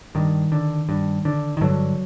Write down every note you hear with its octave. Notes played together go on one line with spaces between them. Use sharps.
G2 D#3
D3
G2
D3
D#3
G2 D3 F#3